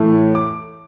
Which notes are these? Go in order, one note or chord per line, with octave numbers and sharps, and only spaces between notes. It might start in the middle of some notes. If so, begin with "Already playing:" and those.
Already playing: A2 E3 A3
D6